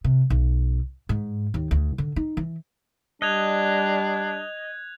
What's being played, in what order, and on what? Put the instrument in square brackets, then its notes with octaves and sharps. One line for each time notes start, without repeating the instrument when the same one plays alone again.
[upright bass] C3
B1
G#2
D#2
D2
D3
D#4
E3
[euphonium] G3 [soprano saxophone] D4 [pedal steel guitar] D#5 [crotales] F#6 G#6 F7